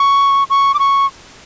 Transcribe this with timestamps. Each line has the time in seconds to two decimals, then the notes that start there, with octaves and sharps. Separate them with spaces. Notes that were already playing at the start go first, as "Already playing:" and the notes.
Already playing: C#6
0.50 C#6
0.74 D6
0.79 C#6